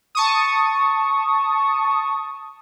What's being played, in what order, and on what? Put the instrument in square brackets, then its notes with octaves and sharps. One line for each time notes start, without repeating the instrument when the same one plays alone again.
[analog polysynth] A5 C#6 D#6